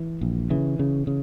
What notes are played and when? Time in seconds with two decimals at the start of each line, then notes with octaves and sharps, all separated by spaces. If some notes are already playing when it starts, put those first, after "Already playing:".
Already playing: E3
0.21 A#1
0.50 C#3 E3
0.79 C#3
1.07 C#3